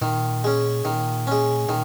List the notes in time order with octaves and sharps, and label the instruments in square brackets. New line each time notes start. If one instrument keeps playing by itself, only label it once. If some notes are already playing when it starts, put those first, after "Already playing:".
[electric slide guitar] A#2 [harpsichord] D#3
[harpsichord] G#3 C#4
[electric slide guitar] A#2 [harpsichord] D#3
[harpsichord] G#3 C#4
[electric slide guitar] A#2 [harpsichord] D#3